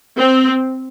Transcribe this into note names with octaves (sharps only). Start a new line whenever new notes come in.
C4